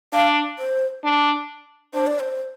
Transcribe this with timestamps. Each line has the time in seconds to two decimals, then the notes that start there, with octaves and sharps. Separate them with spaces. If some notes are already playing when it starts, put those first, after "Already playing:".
0.13 D4 F5
0.59 C5
1.04 D4
1.94 D4 C5
2.07 D5
2.20 C5